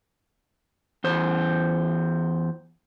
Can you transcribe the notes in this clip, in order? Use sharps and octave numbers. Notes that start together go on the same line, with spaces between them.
E2 C5